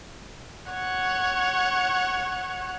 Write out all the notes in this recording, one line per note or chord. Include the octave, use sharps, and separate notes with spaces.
C#5 F#5